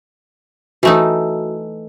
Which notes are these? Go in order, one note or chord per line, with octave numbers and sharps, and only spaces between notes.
E3 A3 D#4 F#4